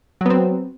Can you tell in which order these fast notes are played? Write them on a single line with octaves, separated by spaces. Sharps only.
F#3 B3 C4